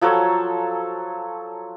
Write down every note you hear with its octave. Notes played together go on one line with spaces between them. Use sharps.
F3 F#3 A4 C#5